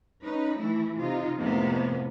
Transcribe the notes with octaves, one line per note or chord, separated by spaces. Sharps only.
C#4 D#4 B4
E3 A3 E4
C3 D#4 F4
F2 A2 C3 A#3 B3